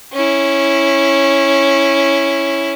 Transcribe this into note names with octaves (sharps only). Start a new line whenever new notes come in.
C#4 E4